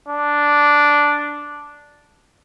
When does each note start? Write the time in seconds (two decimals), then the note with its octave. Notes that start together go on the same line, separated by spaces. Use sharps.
0.08 D4